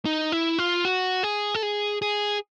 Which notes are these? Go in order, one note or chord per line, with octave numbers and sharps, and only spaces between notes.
D#4
E4
F4
F#4
G#4
A4
G#4
G#4